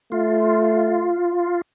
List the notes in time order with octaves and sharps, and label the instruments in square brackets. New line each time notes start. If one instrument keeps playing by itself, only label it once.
[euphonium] A3 [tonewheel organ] F4